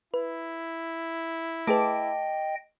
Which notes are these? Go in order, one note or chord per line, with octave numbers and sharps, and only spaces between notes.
E4 B4
A3 G#4 B4 D#5 G5 A5 D6